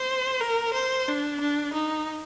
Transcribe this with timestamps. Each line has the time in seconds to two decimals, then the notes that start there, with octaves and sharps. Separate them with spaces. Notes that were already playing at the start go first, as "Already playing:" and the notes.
Already playing: C5
0.41 A#4
0.74 C5
1.08 D4
1.41 D4
1.74 D#4